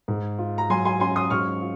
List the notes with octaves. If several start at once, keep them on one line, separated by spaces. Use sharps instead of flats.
G#2
F4
A#5
F#3 G#5 C6
G#5 C6
C#4 G#5 C6
C6 D#6
G#2 C#6 F6
F4